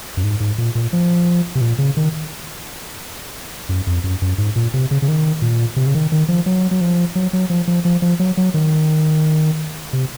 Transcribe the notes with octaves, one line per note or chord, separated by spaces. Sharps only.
F#2
G#2
G#2
A#2
A#2
F3
C3
A#2
C#3
D#3
F#2
F2
F#2
F#2
G#2
A#2
C3
C#3
C#3
D#3
A#2
C3
C#3
D#3
D#3
F3
F#3
F#3
F3
F#3
F#3
F3
F3
F3
F3
F#3
F#3
D#3
C3